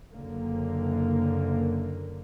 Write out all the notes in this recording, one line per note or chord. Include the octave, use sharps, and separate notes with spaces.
F#1 F#2 D3 A#3